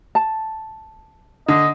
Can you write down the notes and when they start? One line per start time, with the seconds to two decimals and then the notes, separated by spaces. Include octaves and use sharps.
0.15 A5
1.48 D3 D#5